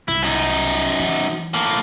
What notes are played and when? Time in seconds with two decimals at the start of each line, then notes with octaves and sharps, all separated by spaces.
0.08 C2 E4
0.23 F#2 D#4
1.00 E3
1.54 A2 A#3